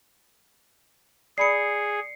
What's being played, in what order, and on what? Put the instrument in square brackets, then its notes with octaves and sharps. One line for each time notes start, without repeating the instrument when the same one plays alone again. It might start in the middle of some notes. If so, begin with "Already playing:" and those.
[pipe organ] G#4 [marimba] D5 B5 D#6 [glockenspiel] C7 C#7